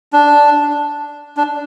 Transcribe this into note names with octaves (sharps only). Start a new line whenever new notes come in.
D4
D4